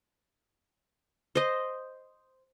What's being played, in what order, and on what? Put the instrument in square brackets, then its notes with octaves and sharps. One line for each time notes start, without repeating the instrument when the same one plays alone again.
[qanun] C5 D#5